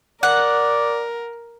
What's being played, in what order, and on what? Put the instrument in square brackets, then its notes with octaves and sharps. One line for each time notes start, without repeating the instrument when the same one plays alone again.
[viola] A#4 [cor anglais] D5 [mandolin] F#5